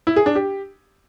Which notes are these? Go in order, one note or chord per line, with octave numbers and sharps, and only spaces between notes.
E4
G#4
D4
G4